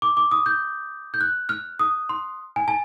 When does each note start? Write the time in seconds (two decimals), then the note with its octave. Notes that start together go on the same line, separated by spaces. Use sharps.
0.02 D6
0.17 D6
0.31 D#6
0.46 G6
1.14 G6
1.21 F#6
1.49 F6
1.79 D#6
2.09 C6
2.56 G#5
2.68 A5